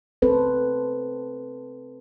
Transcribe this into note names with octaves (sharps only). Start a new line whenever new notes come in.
C4 A4 B4 C5